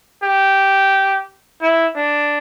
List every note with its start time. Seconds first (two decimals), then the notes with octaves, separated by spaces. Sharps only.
0.23 G4
1.62 E4
1.96 D4